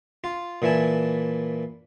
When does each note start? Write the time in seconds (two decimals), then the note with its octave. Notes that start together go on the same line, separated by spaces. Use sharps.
0.24 F4
0.62 A#2 E3 E4 G#5 A5